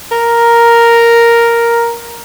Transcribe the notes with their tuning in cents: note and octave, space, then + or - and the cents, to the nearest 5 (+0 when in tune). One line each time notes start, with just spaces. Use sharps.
A#4 +0